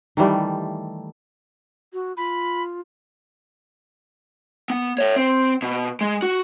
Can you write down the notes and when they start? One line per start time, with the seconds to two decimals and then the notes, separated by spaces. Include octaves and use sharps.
0.17 D#3 E3 G3 A3
1.93 F#4
2.17 F4 B5
4.70 B3
4.98 C#5 E5
5.16 C4
5.62 B2
6.01 G#3
6.22 F#4